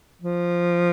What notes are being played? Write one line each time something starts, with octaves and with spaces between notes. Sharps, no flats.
F3